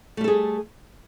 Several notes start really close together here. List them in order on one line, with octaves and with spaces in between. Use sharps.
A3 G3 A4 G#4